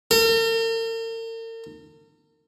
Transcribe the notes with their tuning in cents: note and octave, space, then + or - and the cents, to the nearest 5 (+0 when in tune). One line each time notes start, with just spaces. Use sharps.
A#4 -45